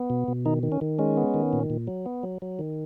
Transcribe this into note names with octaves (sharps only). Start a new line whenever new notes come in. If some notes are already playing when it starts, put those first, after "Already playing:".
Already playing: B3
B2
B2
D#3 D#4
D#3
C#4
D#3
G#3 C#4
B3
D#3
A#2
A#2
F#3
B3
F#3
F#3
D#3